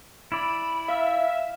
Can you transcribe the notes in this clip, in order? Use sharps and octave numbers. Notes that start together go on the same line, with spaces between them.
E4 D5 B5
E5 F5